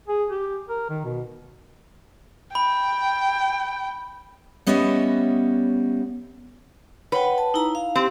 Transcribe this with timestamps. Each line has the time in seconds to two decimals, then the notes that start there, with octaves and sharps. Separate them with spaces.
0.08 G#4
0.30 G4
0.69 A#4
0.89 D#3
1.05 B2
2.55 G5 B5
4.67 G3 B3 C#4 C#5 D#5 E5
7.12 B4 C#5 F#5 G5
7.38 A5
7.54 D#4 E4 A#5
7.75 F5
7.96 C4 G4